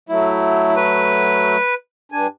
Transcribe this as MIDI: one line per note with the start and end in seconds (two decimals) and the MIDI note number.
0.09 1.56 54
0.09 1.56 57
0.09 0.74 64
0.76 1.74 71
2.12 2.27 43
2.12 2.27 62
2.12 2.27 80